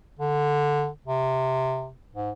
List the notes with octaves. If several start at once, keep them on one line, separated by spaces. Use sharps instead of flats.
D3
C3
G#2